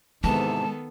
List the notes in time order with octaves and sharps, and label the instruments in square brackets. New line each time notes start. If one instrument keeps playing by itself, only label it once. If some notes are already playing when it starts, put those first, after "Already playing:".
[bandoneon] G#2 C3 E3 [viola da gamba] D#3 B3 A4 [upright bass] G#3 [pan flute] A5